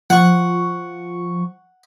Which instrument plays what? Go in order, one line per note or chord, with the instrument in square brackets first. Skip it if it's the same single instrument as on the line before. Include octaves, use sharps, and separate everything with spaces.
[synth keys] F3 C#6 [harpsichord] F#5